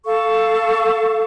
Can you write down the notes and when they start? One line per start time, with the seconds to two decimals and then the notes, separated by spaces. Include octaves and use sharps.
0.05 A4 F5 C#6